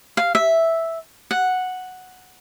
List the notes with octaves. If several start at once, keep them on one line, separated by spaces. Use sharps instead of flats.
F5
E5
F#5